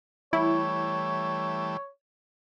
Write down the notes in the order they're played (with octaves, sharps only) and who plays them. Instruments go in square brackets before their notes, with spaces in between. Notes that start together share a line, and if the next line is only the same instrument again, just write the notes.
[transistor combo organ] E3 G3 A3 [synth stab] E4 [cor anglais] C#5